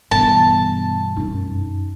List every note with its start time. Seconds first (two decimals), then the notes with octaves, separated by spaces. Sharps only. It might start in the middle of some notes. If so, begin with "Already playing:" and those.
0.11 G2 B2 E3 B3 D4 A5
1.16 F#2 D#4